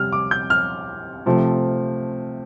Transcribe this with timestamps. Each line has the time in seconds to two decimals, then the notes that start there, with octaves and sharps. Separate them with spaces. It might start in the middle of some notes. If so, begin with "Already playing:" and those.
Already playing: C3 G3 F6
0.12 D6
0.31 G6
0.50 F6
1.26 C3 F3 A3